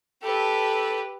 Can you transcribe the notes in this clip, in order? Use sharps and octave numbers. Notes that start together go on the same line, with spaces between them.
G4 A4 B4